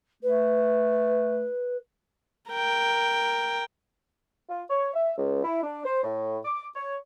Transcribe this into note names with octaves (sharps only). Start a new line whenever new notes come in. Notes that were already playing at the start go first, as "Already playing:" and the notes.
A3 B4
A#4 G5
F4
C#5
E5
C#2
E4
D4
C5
A2
D6
C#5